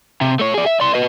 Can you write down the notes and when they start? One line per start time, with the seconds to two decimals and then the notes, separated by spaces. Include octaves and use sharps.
0.21 C3
0.39 A3 C#5
0.54 G#4 D5
0.66 E5
0.80 D5 C6
0.94 B4 D#5